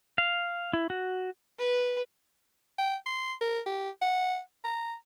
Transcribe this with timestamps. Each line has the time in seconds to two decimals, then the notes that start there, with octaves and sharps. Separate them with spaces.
0.18 F5
0.73 E4
0.90 F#4
1.59 B4
2.78 G5
3.06 C6
3.41 A#4
3.66 G4
4.02 F#5
4.64 A#5